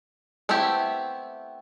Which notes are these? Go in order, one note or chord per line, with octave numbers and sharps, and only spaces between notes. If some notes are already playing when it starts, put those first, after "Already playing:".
A3 B3 C4 E4 G4